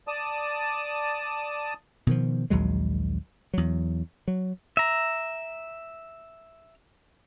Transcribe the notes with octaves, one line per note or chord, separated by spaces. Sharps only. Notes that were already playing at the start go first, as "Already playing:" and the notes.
D5 A5 D#6
B2 D#3 F3
A#1 D#2 F#3 G#3
E2 F#3
F#3
E5 A#5